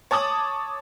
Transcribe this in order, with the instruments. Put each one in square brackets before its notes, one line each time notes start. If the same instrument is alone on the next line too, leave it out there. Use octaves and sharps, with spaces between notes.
[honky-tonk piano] C#5 A5 D6 D#6 F#7